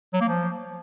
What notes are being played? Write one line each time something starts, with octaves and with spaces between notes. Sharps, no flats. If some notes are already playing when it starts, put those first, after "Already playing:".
F#3
A#3
F3